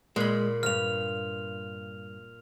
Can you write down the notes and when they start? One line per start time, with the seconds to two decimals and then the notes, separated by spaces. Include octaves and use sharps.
0.16 A#2 G#3 B5
0.63 C#2 G2 F6 F7